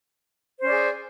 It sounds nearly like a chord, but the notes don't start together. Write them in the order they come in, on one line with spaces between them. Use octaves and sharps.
C5 C#4 D5 G#4